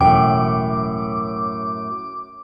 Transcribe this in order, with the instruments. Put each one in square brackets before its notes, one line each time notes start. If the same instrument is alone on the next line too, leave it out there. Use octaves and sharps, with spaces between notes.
[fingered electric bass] E1 [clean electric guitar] F#2 A2 [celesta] G5 [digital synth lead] D6